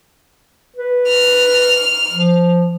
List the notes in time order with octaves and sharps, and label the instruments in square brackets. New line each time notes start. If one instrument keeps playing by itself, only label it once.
[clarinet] B4
[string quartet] F6
[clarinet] F3